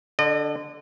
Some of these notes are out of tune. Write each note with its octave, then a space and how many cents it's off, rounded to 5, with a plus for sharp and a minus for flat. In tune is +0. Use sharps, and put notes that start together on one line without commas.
D3 +0 D#5 -40